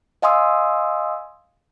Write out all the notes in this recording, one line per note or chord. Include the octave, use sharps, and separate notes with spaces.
D#5 F5 G#5 C6 D#6 E6